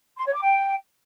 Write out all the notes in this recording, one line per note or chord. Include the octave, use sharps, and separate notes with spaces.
C6
C#5
D6
G5